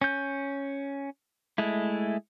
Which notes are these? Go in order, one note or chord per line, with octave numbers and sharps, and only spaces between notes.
C#4 G6
G#3 A3 E4